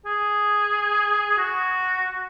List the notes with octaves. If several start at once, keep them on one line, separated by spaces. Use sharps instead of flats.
G#4
F#4